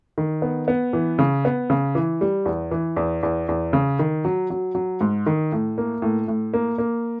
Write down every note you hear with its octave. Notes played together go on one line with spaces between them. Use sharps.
D#3
B3
B3
E3
C#3
B3
C#3
E3
G3
E2
E3
E2
E2
E2
C#3
D#3
F#3
F#3
F#3
G#2
D#3
A2
A#3
A2
A2
A#3
A#3